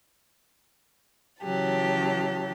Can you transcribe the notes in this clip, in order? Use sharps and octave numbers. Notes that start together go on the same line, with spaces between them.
C#3 E3 F#3 G4 A5